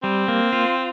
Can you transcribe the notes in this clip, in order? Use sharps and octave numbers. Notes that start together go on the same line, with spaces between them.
G3 C4
A#3
F4